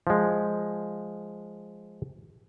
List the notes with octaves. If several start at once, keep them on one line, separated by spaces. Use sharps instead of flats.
F3 G#3